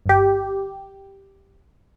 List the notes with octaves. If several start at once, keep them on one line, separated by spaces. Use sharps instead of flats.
G1 G4